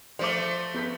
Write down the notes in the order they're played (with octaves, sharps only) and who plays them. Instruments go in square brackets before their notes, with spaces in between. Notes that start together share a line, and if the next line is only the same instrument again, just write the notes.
[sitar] F3 A3 [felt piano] C5 D6
[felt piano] B3 G6 B6